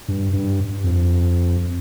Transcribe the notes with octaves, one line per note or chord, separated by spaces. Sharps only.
G2
G2
F2